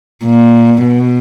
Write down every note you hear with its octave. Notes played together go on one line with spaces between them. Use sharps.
A#2
B2